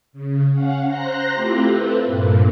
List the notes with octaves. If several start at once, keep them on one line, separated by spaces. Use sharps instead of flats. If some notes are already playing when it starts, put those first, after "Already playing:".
C#3
C#4 F5 F#5
C5 A#5 C6 F#6 A#6
A3 C4 E4 F4 G4
C4 A4 B4
G2 A#2 A#3